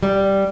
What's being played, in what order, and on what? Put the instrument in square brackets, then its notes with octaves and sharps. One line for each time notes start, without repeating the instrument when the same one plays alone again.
[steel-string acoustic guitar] G3